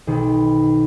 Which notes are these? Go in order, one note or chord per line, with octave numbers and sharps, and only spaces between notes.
B1 D#3 B3 C5